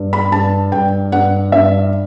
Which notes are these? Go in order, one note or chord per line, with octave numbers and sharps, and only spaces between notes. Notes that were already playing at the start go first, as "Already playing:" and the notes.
Already playing: G2
B5
G2 A5
G2 G5
G2 F#5
G2 E5